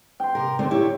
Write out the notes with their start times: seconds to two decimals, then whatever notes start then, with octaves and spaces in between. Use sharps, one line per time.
0.20 G5 C6
0.35 C3 A#4
0.59 D3 A3 C4
0.71 E4 G4 C#5